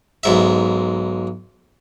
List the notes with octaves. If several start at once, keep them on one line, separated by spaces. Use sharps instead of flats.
B1 G#2 E5